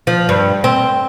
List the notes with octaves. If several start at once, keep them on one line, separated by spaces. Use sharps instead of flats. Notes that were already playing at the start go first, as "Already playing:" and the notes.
F3
G2
C4